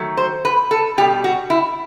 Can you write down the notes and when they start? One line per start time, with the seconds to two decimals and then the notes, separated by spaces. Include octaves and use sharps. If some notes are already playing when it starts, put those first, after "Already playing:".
Already playing: D#3 F#3 A3
0.17 C5
0.45 B4
0.71 A4
0.98 B2 G3 G4
1.24 F#4
1.50 E4